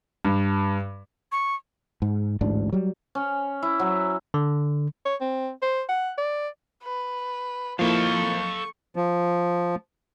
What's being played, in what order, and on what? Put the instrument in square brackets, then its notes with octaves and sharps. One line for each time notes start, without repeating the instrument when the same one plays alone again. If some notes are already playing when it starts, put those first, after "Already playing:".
[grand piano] G2
[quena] C#6
[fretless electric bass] G#2
A1 D2 G#2 D4
F#3 G3
[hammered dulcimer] C#4
E4
F#3
[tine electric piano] D3
[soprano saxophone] C#5
C4
C5
F#5
D5
[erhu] B4
[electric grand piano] F3 A#3 E4 [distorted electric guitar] A4 F5 [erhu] C#6
[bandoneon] F3